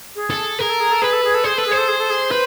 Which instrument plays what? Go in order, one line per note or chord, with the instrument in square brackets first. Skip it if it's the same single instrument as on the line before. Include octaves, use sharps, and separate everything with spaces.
[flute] G#4
[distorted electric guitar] A4
[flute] G#4 [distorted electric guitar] A#4
[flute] A4
G#4
A4
[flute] G#4 [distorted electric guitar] B4
[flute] A4
G#4
A4
[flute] G#4 [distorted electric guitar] C5
[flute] A4 [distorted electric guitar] B4
[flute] G#4
[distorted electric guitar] C5
[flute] A4
G#4
A4
G#4
[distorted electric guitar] B4 [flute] C5